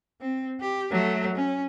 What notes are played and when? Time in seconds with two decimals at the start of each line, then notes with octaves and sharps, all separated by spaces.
0.21 C4
0.61 G4
0.91 F#3 A3
1.36 C#4